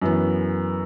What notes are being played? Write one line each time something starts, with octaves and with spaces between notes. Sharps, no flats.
F#2 E3 B3